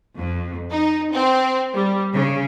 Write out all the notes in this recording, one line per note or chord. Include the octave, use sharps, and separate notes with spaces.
F2
D#4
C4
G3
C#3